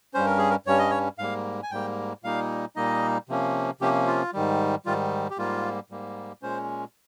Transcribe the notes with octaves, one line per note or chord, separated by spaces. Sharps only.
G2 G3 C#4 C5
A#4
G#4
A#4
G2 G3 C#4 C#5
D#5
C#5
G#2 G3 A#3 F5
G#5
G#2 G3 A#3 G5
A#2 G3 A#3 D#4 F5
A#2 G3 A#3 D#4 D#5
C3 F3 A#3 C#4
C3 F3 A#3 C#4 G4
F4
G#2 D#3 G3
G#2 D#3 G3 F4
G4
G#2 G3 A#3 F4
G#2 G3 A#3
A#2 G#3 C#4 C5